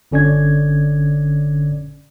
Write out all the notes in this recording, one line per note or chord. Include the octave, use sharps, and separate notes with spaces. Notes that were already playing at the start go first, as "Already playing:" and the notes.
G1 D3 C#4 D5 G#6